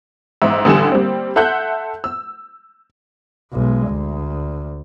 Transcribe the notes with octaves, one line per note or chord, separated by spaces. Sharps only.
A1 G#2 E5 E6
A1 D3 G3 G#5 E6 E7
G3 A#3 C4
A4 E5 F#5 C6 F#6 G6
E6
B1 G#3
D2